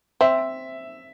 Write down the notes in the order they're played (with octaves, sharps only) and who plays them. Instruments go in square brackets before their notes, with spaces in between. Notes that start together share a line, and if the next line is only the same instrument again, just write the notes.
[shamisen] C4 [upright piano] E5